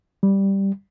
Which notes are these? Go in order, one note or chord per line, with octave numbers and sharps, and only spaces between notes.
G3